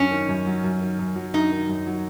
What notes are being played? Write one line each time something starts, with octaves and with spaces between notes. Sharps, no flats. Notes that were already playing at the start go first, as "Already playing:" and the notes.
Already playing: F#2 C#4
D#3
F#2
F#3
F#2
D#3
F#2
F#3
F#2 D#4
D#3
F#2
F#3